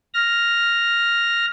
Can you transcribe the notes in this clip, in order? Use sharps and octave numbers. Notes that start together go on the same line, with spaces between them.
F6 A#6